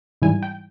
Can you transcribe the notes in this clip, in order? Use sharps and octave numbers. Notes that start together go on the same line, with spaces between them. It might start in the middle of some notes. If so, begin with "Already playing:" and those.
G#2 E3 G3 G#5
G5